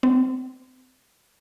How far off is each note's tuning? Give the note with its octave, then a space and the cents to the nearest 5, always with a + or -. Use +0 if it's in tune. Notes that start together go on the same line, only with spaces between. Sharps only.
C4 -30